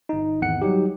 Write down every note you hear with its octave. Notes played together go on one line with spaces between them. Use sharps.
G1 D#4
G#1 E2 F#5 C#7
F#3 G3 D#4 G4